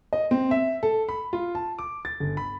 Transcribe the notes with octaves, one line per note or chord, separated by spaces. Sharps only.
D#5
C4
E5
A4
B5
F4
A5
D6
A6
G1
B5